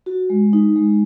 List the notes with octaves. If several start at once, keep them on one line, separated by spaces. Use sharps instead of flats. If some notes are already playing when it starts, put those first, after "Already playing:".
F#4
G#3
D#4
G#3